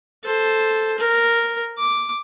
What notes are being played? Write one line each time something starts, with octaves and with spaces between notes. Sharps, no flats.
A4 C5
A#4
D6